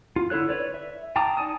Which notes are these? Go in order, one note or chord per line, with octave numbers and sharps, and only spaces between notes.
F4
D3 E4 A4 C#5 F#6
B4 C#5 D5
E5
G5 A5 A#5 D6 D#6
D#4 D5 G#5 A5 D#6